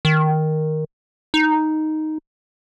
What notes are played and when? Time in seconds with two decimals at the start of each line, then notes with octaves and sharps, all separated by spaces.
0.05 D#3
1.34 D#4